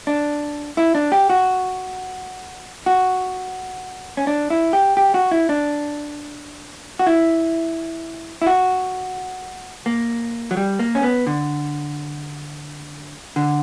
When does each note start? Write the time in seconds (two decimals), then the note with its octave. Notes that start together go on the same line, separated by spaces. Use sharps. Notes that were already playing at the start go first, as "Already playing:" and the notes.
0.07 D4
0.77 E4
0.95 D4
1.12 G4
1.30 F#4
2.86 F#4
4.17 C#4
4.27 D4
4.50 E4
4.73 G4
4.97 G4
5.14 F#4
5.31 E4
5.49 D4
6.99 F#4
7.06 E4
8.42 E4
8.46 F#4
9.86 A#3
10.51 F#3
10.57 G3
10.79 A#3
10.95 C#4
11.03 B3
11.27 D3
13.36 D3